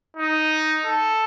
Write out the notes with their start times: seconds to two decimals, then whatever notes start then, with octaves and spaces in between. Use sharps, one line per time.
0.17 D#4
0.86 A4